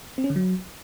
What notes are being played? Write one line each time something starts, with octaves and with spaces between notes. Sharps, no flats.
C4
C#4
D3
F#3